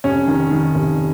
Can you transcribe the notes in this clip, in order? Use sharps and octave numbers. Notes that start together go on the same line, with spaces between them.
F1 C#4
D#3
D#3
F1